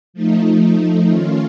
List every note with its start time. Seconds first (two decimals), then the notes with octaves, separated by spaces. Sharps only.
0.14 F3 A3 D#4
1.07 D#3 A3 C#4 F4